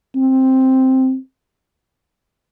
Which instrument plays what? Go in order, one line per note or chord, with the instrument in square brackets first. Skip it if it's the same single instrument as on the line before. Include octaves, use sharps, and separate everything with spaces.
[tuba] C4